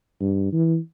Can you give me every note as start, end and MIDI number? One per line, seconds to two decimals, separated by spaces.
0.21 0.48 43
0.52 0.78 52